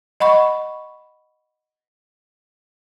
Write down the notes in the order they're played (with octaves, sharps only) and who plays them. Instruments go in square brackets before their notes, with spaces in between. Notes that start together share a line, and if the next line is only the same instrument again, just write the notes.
[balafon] D#5 F#5 B5 C#6